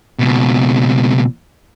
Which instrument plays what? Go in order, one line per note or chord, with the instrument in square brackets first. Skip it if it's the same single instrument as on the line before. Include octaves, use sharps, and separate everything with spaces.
[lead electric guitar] C#2 B2